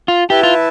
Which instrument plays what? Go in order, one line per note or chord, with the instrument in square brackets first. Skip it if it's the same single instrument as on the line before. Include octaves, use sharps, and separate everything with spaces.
[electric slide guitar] F4
[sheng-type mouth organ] E4 B4 E5 A5 [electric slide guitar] G4
[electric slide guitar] F4